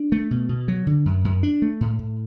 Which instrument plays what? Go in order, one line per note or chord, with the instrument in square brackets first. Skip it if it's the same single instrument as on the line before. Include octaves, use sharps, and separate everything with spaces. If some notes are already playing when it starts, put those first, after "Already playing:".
Already playing: [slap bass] D4
A3
B2
B2
F#3
D3
F#2
F#2
D4
A3
A2
A2